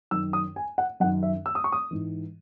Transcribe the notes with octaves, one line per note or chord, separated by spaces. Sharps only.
F#2 D#3 E6
D#6
G#5
F#5
F#2 D#3 F#5
E5
E6
D#6
C#6
D#6
G#2 E3